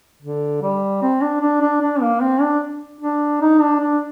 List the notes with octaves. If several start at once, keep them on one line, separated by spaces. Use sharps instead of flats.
D3
G3
C4
D4
D4
D4
D4
A#3
C4
D4
D4
D#4
D4
D4